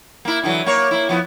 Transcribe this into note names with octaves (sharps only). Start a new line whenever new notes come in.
A#3 E4
D3 E3 F#3
A#3 C#5
A#3 E4
F3 B3 E4